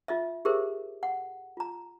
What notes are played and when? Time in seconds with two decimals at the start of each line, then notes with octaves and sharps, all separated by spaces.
0.08 F4 D#5 E5
0.45 G4 G#4 A#4 C5 E5
1.03 F#5
1.57 F4 A#5